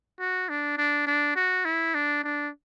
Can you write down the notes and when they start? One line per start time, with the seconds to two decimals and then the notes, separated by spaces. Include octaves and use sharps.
0.20 F#4
0.49 D4
0.78 D4
1.07 D4
1.36 F#4
1.65 E4
1.95 D4
2.23 D4